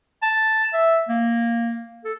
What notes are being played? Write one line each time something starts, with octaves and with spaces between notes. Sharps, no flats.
A5
E5
A#3
A4